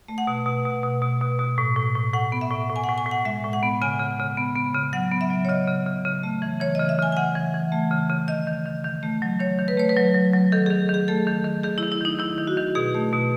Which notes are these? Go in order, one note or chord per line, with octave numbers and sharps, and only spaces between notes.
A3
F#5
B2
B2
B2
B2
B2
B2
B2
A2
A2
A2
A2 F#5
B3
E5
A2
A2
G#5
F#5
A2
G#5
A2 F#5
G#3 E5
A2
F#5
B3
C#3 G#5
C#3
C#3
B3
B3
C#3
F#3 F#5
B3
E5
F#3
C#5
C#3 D#5
C#3
C#3
C#3
A3
E3
E3 C#5
C#3 D#5
E5
C#3 G#5
G#5
C#3 F#5
E3
E3
A3
C#3
C#3
D#3 D#5
D#3
D#3
D#3
A3
F#3
D#3 C#5
D#3
B4
A3 C#5
B4
F#3
F#3
F#3
D#3 A4
D#3 G#4
D#3 G#4
A3 A4
D#3
D#3
D#3 G#4
D#3 E4
E4
D#3 D#4
D#3 E4
D#3
F#4
D#3
B2 G#4
A3
B2